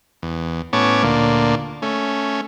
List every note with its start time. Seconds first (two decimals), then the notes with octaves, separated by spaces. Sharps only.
0.23 E2
0.73 A2 B3 C#4 C#5 A5 D6
1.03 D2 A#2 A#3 D4
1.82 A3 C#4